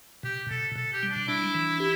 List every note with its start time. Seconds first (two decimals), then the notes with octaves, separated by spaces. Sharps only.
0.23 B2 G4
0.50 B2 A4
0.76 B2 A4
0.93 G4
1.03 G3
1.11 D4
1.28 D4 E4
1.54 E3
1.80 G4